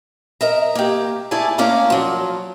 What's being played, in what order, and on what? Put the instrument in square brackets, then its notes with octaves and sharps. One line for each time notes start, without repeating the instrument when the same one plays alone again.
[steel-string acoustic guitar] A#4 D#5 E5 A#5
A#3 G4
A3 E4 G#4 D5 G#5 A5
A3 A#3 C#4 D5 F5 A#5
F3 F#3